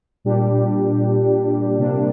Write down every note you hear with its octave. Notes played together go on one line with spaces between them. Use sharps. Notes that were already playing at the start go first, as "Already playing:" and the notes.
A#2 G3 D4 G4
C3 G3 A#3 D4